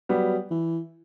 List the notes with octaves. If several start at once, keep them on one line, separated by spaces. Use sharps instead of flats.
F#3 G3 B3
E3